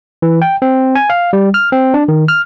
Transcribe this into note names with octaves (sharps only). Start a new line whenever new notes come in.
E3
G5
C4
G#5
F5
G3
F6
C4
D4
D#3
F6